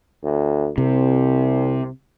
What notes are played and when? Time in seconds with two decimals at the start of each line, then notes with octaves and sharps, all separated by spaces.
0.23 D2
0.78 C2 C3